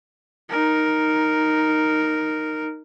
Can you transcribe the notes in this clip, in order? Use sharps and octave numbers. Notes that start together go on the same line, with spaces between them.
D#4 A#4